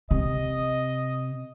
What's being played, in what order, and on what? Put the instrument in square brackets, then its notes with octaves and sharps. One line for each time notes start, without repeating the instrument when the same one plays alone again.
[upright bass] C3 [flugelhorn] D#5